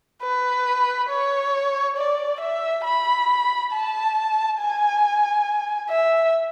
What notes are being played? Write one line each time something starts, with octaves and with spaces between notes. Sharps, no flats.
B4
C#5
D5
E5
B5
A5
G#5
E5